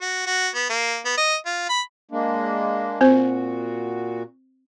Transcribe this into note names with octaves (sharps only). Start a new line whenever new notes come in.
F#4
F#4
B3
A#3
B3
D#5
F4
B5
G#3 A#3 D4
A#2 C4 F#4 C5